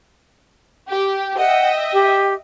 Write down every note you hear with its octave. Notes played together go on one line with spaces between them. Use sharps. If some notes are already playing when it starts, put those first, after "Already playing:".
G4
D#5 E5 F#5 G5
G4